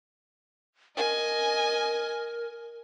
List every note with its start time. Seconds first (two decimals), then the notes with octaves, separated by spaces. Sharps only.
0.97 A#4 D#5 G#5